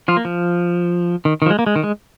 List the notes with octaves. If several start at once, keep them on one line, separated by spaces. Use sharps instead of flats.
F3 F4
A#3
F3
D#3
D#3
F3
G#3
A#3
G#3
D#3
G#3